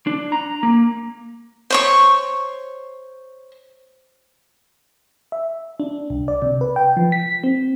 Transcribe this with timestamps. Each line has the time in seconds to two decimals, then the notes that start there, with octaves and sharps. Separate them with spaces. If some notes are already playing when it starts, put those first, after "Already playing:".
0.07 D4
0.32 A#5
0.63 A#3
1.70 C5 C#5 C#6
5.32 E5
5.80 D4
6.10 C2
6.28 D5
6.42 C3
6.61 B4
6.76 G5
6.97 F3
7.12 B6
7.44 C4